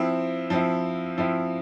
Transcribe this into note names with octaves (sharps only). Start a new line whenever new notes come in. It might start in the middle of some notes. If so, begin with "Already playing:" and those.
Already playing: F3 C4 E4
F3 C4 E4
F3 C4 E4